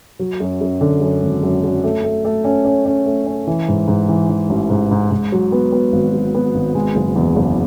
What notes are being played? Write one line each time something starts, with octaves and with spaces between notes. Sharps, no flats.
F#3
F#2
F#2
D3
F#2
G#1
F#2
F#2
A3
A3
A3
C#4
C#4
C#4
A3
C#4
E3
G#2
G#2
E3
E3
A1
G#2
G#2
G#2
F#3
B3
B3
G#1
F#3
B3
G#1
G#3
F#1
E2
F#1